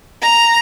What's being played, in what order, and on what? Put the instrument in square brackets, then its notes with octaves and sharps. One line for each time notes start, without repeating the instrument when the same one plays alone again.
[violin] A#5